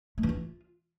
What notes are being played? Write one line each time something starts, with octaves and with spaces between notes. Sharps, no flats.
A3
E3
F4